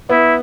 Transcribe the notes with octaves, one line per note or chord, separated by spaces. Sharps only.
B3 E4